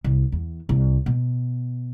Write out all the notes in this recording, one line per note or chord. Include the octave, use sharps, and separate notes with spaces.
C2
E2
C2
B2